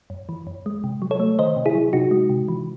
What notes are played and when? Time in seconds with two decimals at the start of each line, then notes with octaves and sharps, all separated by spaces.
0.10 F#2
0.29 E3
0.47 F#2
0.66 G#3
0.84 C3
1.02 F#3
1.11 A4 C#5
1.20 A3
1.39 D#3 C5 D#5
1.56 C3
1.66 E4 G#4
1.75 F#3
1.93 C3 D#4 F#4
2.11 G#3
2.30 C3
2.48 E3